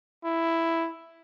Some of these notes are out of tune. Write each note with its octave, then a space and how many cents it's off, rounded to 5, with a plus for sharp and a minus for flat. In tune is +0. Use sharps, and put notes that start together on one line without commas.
E4 +5